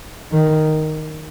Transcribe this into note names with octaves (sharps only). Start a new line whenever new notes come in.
D#3